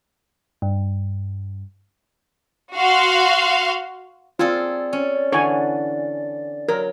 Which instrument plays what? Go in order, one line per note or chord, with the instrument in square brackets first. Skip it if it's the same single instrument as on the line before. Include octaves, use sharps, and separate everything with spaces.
[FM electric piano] G2
[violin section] F#4 F5 C6
[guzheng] C4 G#4 A4 [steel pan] F4 [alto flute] D5
[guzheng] C#4
[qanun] D3 E3 [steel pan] C#5 G#5
[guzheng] F#3 [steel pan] A#4